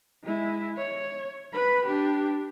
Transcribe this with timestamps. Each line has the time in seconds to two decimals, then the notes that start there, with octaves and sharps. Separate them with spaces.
0.24 G#3 E4
0.77 C#5
1.54 B4 B5
1.86 D4 G4